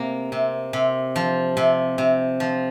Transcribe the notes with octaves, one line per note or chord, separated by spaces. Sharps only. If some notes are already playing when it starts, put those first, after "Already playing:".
Already playing: C3 A#3
C3
C3
F3
C3
C3
F3